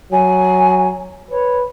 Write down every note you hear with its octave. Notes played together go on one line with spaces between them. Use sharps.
F#3 G#5
B4 C#5